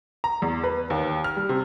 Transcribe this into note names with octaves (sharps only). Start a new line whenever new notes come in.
A#5
E2
B4
D#2
F6
G3
C3